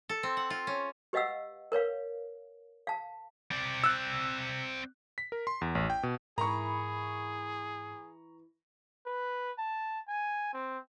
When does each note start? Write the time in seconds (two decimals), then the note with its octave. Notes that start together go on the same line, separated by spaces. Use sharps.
0.09 A4
0.23 C4
0.37 F#5
0.50 F4
0.67 C#4
1.13 G4 B4 D#5 F5 F#5 E6
1.72 A#4 B4 C#5 F5
2.87 F5 A5
3.51 C4 D5
3.84 E6 F#6
5.18 B6
5.32 A#4
5.47 C6
5.61 E2
5.75 A1
5.90 G5
6.03 B2
6.38 G#2 E3 E4 G#4 A#4 A#5 C#6
9.06 B4
9.58 A5
10.08 G#5
10.53 C4